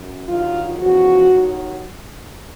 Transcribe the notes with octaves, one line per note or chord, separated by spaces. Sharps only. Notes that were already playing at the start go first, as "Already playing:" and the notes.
Already playing: F#2
G2 D#3 F#3 F4
E2 C#3 F3 F#4
D#2 D#3 F#3